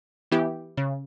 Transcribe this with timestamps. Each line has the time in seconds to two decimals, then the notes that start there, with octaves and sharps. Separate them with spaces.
0.32 E3 B3 E4 G4
0.77 C#3